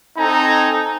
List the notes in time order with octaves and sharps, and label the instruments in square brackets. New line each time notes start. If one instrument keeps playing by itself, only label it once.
[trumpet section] C4 D#4 A4 G#5 A#5